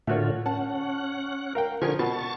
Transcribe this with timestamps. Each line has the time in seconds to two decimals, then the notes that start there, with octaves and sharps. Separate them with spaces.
0.07 A2 D3 A3 F4 F#4 C#5
0.46 C#4 F#5 A5
1.55 A#4 F5 G5
1.82 D3 F3 G#4 A#4 C#6 G#6
1.99 B2 A5 C#6 A6